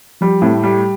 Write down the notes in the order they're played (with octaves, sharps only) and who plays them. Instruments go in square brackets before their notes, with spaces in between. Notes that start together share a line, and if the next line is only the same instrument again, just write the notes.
[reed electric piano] F3 [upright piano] G3
[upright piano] A2 [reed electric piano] C4
[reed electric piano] A3
[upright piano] G3